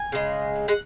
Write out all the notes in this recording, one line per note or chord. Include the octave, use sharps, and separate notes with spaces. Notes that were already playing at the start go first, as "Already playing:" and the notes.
Already playing: G#5
C#3 G#3
G#3 F#5